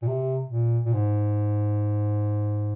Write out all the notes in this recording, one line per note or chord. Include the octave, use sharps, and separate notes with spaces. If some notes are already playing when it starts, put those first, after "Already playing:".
A#2
C3
A#2
A#2
G#2